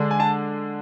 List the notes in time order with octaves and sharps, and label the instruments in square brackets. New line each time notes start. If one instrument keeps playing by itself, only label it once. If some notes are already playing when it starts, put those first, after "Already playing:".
Already playing: [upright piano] D3 G#3 D4
[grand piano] G#5
A5